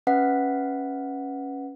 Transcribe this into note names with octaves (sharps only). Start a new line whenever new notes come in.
C#4 B4 E5 F#5 B6